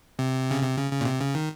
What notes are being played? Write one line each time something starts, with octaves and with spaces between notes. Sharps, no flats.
C3
C#3
C3
C#3
C#3
A#2
C3
C#3
D#3